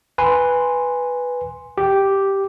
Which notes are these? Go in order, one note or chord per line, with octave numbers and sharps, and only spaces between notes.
B4 G#5 C6
G4